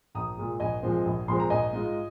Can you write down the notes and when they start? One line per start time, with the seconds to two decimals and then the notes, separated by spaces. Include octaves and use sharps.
0.15 A#1 A#5 D#6
0.37 A#2 G#3
0.60 A#1 D#5 G#5
0.83 A#2 F3 G#3 C4
1.05 A#1
1.28 A#2 F3 G#3 C4 C6
1.40 A#5
1.50 A#1 D#5 G#5
1.73 G#2 G#3 F4